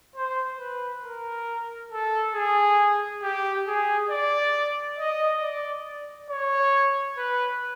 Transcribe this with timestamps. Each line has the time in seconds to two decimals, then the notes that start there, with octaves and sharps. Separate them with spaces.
0.16 C5
0.59 B4
1.04 A#4
1.92 A4
2.35 G#4
3.22 G4
3.67 G#4
4.10 D5
4.99 D#5
5.42 D5
6.30 C#5
7.17 B4